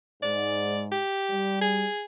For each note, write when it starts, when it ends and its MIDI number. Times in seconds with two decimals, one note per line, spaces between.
0.22 0.98 44
0.22 0.81 74
0.92 1.57 67
1.31 1.84 55
1.61 2.04 68